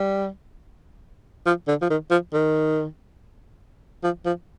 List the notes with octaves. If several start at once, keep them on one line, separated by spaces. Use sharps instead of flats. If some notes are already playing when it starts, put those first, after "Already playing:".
Already playing: G3
F3
D3
F3
D#3
F3
D#3
F3
F3